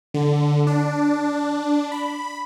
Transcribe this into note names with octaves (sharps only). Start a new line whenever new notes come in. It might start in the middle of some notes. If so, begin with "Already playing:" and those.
D3
D4
B5